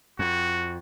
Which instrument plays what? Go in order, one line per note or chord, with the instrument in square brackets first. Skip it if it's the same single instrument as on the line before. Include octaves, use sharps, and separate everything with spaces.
[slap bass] F2 [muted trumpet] F#4